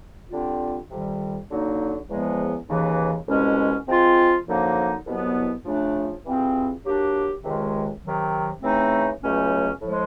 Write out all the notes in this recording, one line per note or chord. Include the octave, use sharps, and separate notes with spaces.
D3 G3 C4 F4
F2 C3 D#3 G3
D3 F#3 A#3 D#4
E2 C#3 F3 G#3 B3
D#2 C#3 E3
C2 B2 G#3 C#4
F3 G#3 C4 F4
F#2 D3 F3 A#3 D#4
C2 B2 F#3 B3 E4
C#3 F3 A3 D4
E3 G3 C4 F4 G#4
F#3 A#3 D4 G4
C#2 C3 D#3 G#3
C3 D#3 F#3
C#3 E3 A3 C4 D#4
C#2 B2 F#3 A3 C#4
A2 F3 G#3